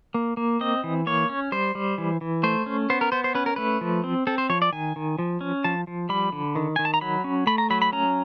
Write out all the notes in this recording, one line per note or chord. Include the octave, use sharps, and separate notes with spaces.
A#3
A#3
C4 D#5
E3
A#3 C#5
C#4
G3 C5
G3
E3
E3
A3 C5
C#4
B3 C5
A#4
B3 C5
C5
C#4 B4
A#4
A3 B4
F3
C4
C4 A4
C5
F3 C#5
D5
D#3 G#5
D#3
F3
C#4
F3 A5
F3
G3 B5
D3
D#3
D#3 G#5
A5
A#5
F#3 B5
C#4
A3 B5
A#5
F#3 B5
B5
C#4 A#5